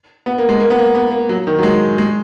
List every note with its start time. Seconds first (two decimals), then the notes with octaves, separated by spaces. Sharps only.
0.26 B3
0.38 A#3
0.49 G#3
0.60 A#3
0.70 B3
0.79 A#3
0.95 B3
1.11 A#3
1.29 F#3
1.47 D#3
1.58 F#3
1.63 G#3
1.98 G#3